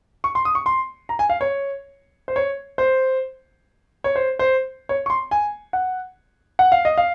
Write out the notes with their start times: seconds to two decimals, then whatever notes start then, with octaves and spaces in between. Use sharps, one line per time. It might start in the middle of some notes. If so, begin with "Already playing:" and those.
0.24 C#6
0.35 C6
0.45 D#6
0.55 C#6
0.66 C6
1.09 A#5
1.19 G#5
1.30 F5
1.41 C#5
2.28 C5
2.36 C#5
2.78 C5
4.04 C#5
4.16 C5
4.39 C5
4.89 C#5
5.06 C#6
5.10 C6
5.31 G#5
5.73 F#5
6.59 F#5
6.72 F5
6.85 D#5
6.98 F5